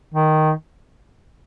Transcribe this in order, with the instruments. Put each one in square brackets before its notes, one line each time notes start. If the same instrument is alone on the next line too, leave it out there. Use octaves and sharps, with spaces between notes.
[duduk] D#3